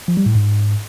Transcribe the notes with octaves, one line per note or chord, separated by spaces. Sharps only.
F3
G3
A2
G#2